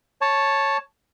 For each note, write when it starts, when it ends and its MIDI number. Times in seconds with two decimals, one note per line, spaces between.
0.21 0.77 73
0.21 0.77 81